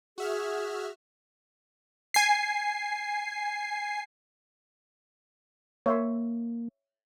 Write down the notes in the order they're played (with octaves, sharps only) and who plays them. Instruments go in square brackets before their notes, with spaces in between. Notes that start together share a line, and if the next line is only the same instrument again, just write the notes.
[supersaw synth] F#4 E5 F6 [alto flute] G#4
[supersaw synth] G#5 C7
[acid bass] A#3 [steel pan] C#5 E5 C6